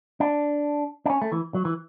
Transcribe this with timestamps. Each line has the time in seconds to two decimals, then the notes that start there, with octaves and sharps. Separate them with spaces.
0.20 D4
1.06 D4
1.10 C#4
1.22 A3
1.32 E3
1.54 F#3
1.65 E3